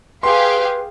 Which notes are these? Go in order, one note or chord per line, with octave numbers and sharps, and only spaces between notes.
G4 G#4 B4 F5 C6